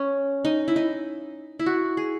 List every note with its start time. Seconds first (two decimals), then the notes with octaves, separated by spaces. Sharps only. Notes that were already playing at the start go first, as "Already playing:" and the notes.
Already playing: C#4
0.45 D#4
0.68 E4
0.76 D#4
1.59 E4
1.66 F#4
1.97 G#4